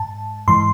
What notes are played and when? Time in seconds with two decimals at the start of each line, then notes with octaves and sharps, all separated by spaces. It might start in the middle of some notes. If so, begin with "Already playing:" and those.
Already playing: G#2 A5
0.48 G#2 E3 C6